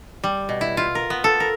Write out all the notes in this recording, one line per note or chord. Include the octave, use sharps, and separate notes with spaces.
G3
B2
E4
F4
A#4
B3
A4
A#4